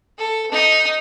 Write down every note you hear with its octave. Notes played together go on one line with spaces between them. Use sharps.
A4
D#4